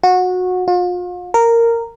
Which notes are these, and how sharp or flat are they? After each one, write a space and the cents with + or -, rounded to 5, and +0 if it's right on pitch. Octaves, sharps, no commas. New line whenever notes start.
F#4 -20
F4 +40
A#4 -10